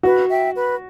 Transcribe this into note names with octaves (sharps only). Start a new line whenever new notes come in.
F#4 B4
E5 G5
B4